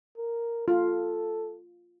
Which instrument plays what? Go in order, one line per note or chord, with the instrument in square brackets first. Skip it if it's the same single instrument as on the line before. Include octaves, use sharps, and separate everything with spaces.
[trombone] A#4
[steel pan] F4 [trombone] A4